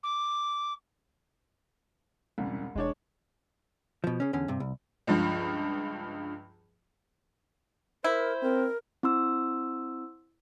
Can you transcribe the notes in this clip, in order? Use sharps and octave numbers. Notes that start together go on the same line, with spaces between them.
D6
E1 C2 C#3
E1 G#3 D4 C#5
B2 F3
C#3 C#4
E2 D3 C#4
G2 C3
C2
C#2 G2 F3
E4 A#4 C5
C4 A#4
C4 E4 C6 E6